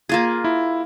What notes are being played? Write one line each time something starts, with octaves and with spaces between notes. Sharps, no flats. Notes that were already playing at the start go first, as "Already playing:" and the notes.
A#3 F4 G#4
E4